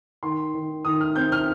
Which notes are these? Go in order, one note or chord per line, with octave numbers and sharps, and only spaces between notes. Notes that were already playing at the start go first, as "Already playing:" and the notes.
D#3 C6
D#3
D#3 D#6
F6
C4 G6
F6